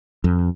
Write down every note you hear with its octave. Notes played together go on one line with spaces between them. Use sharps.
F2